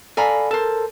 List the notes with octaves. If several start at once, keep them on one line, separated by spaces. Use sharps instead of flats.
A4 D5 F5 G#5 A#5 B5
A4 A#4 C5 A5